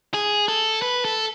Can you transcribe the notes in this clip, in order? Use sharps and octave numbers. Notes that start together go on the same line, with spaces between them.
G#4
A4
B4
A4